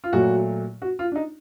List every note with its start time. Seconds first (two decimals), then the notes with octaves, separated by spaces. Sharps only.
0.04 F4
0.13 A#2 F#3 A3 F#4
0.82 F#4
0.99 F4
1.12 D4
1.16 D#4